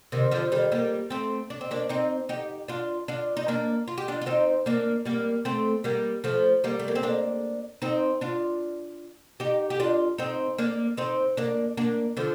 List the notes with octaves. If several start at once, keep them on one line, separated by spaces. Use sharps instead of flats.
C3 D#3
D3 F3
D#3 G3
G3 A#3
A3 C4
D4
C4
A#3 D4
C4 D#4
D#4 G4
D4 F4
D4 F4
D#4
A#3 D4
F4
G4
D4 F4
F4
C4 D#4
A#3 D4
G3 A#3
A3 C4
G3 A#3
F3 A3
G3 A#3
A3
A#3
C4
A#3 D4
C4 D#4
D4 F4
D#4 G4
G4
D4 F4
C4 D#4
A#3 D4
C4 D#4
A#3 D4
A#3 D4
D3 F3